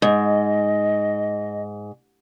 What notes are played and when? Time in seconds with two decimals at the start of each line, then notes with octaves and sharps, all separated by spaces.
0.02 G#2 D#5